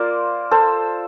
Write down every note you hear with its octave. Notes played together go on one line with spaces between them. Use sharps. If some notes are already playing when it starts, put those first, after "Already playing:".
Already playing: A#3 F4 A#4 C5 D5
A4 C5